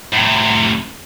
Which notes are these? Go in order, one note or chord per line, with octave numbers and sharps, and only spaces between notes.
A2 C3